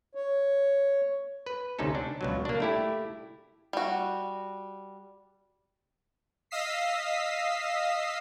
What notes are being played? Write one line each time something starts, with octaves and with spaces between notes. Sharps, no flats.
C#5
B4
D2 C3 C#4 D#4 A4
D4
C#2 B2 F#3
A#3 D4
A3 E4 G4
G3 F#4
D#5 F5 D#6 E6 B6 C7